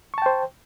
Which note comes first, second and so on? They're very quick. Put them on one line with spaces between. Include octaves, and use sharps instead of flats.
C#6 A5 G5 C5